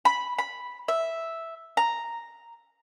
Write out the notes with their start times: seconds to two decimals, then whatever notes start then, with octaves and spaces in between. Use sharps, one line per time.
0.05 B5
0.38 B5
0.88 E5
1.77 A#5